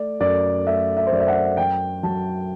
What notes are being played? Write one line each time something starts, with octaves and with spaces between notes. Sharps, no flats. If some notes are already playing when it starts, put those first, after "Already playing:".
Already playing: A3 D5
F#2 D5
A3 E5
E5
C5
F#2 D5
E5
F#5
F#3 G5
F#3 A5